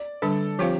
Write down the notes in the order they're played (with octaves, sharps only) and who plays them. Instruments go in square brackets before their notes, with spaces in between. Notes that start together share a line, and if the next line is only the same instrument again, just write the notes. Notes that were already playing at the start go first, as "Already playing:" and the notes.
Already playing: [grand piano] D5
[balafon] D3 G3 D4 [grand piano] A4
[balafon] F3 C4 F4 C5 F5 [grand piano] G4